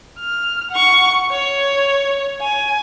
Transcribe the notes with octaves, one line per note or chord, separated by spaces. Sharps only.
F6
F#5 C#6
C#5
G#5